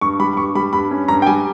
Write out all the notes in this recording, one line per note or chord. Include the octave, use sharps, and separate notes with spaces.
G2 C#6
G3 B5
B5
G2 C#6
G3 B5
G2 B5
C#4
G2 A#5
G5
G3 G#5